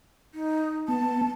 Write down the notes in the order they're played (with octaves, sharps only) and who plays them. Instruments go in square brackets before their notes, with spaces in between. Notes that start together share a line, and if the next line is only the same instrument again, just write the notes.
[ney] D#4
[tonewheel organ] B3 [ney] A5